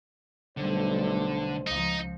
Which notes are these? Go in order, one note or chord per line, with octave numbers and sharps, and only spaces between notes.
B1 D3 G3 A3 C5
C#2 F3 D#4